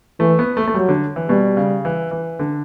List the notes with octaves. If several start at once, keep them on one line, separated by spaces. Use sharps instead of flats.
E3 A3
B3
A3
A3
F#3 G3
D3
E3
B2 G3
C#3
E3
E3
D3